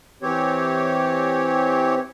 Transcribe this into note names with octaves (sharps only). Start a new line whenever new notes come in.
E3 C4 G4 C#5